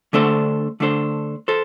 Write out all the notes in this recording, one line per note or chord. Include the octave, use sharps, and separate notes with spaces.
D3 A3 D4 A4 C5
D3 A3 D4 A4 C5
A4 C5